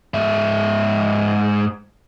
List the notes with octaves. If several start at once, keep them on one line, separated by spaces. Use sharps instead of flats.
G#2 E5